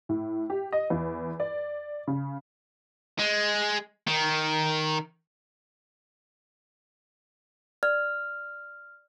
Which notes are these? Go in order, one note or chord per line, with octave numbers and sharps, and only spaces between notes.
A2
G4
D#5
E2
D5
C#3
G#3
D#3
D5 F6